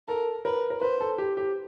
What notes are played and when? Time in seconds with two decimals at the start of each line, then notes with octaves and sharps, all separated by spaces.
0.08 A4 A#4
0.45 A#4 B4
0.70 A#4
0.81 B4 C5
1.01 A4
1.18 G4
1.37 G4